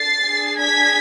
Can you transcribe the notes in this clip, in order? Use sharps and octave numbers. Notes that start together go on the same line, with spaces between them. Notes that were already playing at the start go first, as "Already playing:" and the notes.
Already playing: D4 A4 A6 C7
D4 G#4
G#6 B6